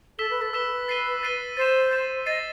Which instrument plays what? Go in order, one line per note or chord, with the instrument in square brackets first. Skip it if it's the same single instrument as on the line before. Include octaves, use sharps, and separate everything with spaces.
[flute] A4 [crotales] E6 B6 E7 G7
[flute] B4
A4
[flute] B4 [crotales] E6 B6 E7 G7
[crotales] A6 C7 D#7 G7
A6 C7 D#7 G7
[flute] C5 [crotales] A6 C7 E7
[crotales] A6 C7 E7
[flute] D#5 [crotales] A6 C7 D#7